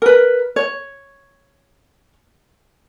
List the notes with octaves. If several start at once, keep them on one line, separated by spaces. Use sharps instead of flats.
A#4 B4
C#5